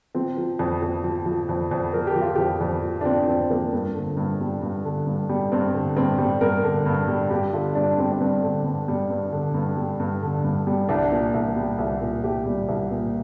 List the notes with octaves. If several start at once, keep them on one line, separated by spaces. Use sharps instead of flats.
F3 C4
F3
F2
F2
F3
F3
F2
F2
F3 A#4
G4
F3
F4
F2 G4
F2
F3
D4
F3 C4
F2 C4
F2 A#3
G2
D3
G2
G3
G2
D3
G2
G3
G2 C4
D3
G2 C4
G3
G2 A#4
D3
G2
G3
G2 G4
D3 F4
G2 D4
G3 C4
D4
G2 C4
D3
G2
G3
G2
D3
G2
G3
G2
D3
G2
G3
C2 D4
A#2
C2
G3
C2
A#2
C2 G4
G3
C2
A#2